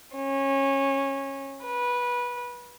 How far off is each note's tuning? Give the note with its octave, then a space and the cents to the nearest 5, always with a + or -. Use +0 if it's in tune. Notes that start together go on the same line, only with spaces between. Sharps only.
C#4 -20
B4 -20